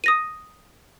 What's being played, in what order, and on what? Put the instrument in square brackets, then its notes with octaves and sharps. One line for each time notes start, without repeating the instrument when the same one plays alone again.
[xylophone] D#6 A#6 D#7